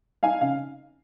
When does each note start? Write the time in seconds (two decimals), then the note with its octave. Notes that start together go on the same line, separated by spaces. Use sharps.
0.23 D#4 F5 G#5
0.41 C#3 F5